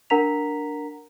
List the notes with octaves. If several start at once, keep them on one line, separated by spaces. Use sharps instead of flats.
D4 A#4 F#5 A#5 B6 F7